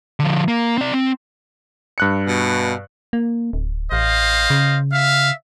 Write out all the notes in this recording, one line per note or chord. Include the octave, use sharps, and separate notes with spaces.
D3 F3
A#3
C4 D5
C4
G2 F#6 C#7
B2
A#3
D1
A1 C5 D#5 F5
C#3
E5 F5